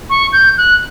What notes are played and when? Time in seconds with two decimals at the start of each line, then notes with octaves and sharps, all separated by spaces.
0.10 C#6
0.33 G6
0.58 F#6